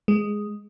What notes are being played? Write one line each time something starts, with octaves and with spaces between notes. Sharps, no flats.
G#3